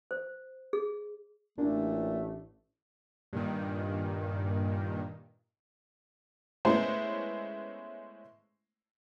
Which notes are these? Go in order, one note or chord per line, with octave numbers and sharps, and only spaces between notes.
C5
G#4
A1 A#2 A3 D4
G2 A#2 D#3
G#3 A3 B3 C#4 E4 C5